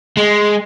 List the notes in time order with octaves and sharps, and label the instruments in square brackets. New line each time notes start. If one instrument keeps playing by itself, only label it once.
[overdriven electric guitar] G#3